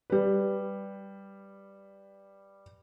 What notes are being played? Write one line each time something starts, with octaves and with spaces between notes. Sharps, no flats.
G3 B4